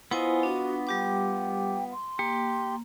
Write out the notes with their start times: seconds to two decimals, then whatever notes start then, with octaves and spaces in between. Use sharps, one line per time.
0.11 B3 E4 F4 C5 D#5 G#5
0.43 D4 F#4
0.87 G3 G4 G5 D6
1.92 C6
2.19 A#3 G4